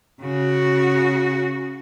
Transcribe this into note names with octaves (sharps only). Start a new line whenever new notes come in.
C#3 F#4